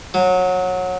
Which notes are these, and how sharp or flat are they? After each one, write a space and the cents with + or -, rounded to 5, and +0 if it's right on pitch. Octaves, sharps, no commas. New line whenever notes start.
F#3 -20